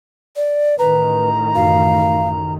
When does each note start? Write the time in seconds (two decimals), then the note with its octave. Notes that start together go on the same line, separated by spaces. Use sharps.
0.36 D5
0.79 A1 D#3 B4 A#5
1.55 F#2 F5